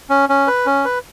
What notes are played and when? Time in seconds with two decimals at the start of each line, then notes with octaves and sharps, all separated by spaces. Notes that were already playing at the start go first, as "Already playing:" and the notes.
0.10 C#4
0.29 C#4
0.47 B4
0.66 C#4
0.85 B4